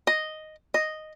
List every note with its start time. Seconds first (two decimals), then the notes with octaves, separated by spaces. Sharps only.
0.07 D#5
0.74 D#5